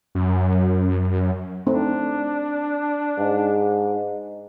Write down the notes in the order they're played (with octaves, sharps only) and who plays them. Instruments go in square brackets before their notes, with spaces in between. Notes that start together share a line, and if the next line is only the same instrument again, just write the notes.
[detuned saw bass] F#2
[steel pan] A3 C4 D#4 [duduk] D4
[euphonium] G#2